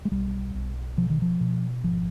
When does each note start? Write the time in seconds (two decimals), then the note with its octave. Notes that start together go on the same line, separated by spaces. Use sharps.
0.05 G#3
0.11 B1 G3
0.55 B1
0.97 B2 F3
1.10 D#3
1.22 F3
1.40 B2
1.84 G#1 F3